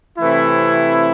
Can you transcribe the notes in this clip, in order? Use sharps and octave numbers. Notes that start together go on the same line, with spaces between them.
C3 E3 A3 C4 E4